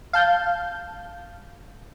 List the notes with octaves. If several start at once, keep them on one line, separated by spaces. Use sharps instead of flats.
F5 A5 G6